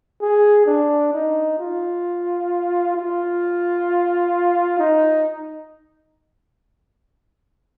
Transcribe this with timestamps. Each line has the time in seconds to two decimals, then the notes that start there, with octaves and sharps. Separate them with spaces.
0.21 G#4
0.66 D4
1.13 D#4
1.59 F4
2.96 F4
4.79 D#4